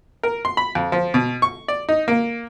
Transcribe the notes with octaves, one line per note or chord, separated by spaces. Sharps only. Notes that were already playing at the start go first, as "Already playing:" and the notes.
A#4
C6
B5
F2
F3
B2
C#6
D5
D#4
A#3